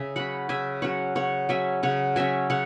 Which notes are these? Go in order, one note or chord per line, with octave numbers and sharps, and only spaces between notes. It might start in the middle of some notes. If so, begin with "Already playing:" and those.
Already playing: C#3 E5 G#5
F#3 C#4 F#5 B5
C#3 E5 G#5
F#3 C#4 C#5 F#5
C#3 C#5 F#5
F#3 C#4 E5 G#5
C#3 C#5 F#5
F#3 C#4 E5 G#5
C#3 C#5 F#5